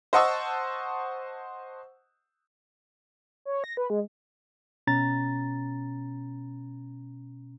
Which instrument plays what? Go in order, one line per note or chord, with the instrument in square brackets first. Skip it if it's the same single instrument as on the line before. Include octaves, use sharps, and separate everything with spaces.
[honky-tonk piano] C5 D#5 F#5 A5 C#6 E6
[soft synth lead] C#5
A#6
B4
G#3
[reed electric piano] B2 C#4 A#5 A6